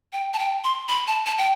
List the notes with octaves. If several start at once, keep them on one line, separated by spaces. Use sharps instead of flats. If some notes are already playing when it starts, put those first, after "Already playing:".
G5
A5
G5
C6
B5
A5
A5
G5